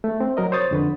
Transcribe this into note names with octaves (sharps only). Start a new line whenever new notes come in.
A3
C4
F#3 A#4 D#5
C5 C#5 D#6 A6
F2 D3 B4